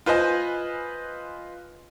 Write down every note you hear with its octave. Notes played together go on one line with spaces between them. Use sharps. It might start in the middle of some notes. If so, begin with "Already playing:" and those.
F4 B4 C5 D#5 G#5